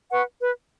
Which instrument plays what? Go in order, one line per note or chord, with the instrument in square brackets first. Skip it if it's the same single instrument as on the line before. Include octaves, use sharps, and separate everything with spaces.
[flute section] B4 F#5 C#6
B4